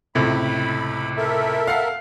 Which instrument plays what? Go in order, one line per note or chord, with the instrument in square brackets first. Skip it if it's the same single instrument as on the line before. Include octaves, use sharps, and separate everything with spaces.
[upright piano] C#2 A2 C3 [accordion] B5
[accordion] A4 A#4 E5
[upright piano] F5 F#5 C7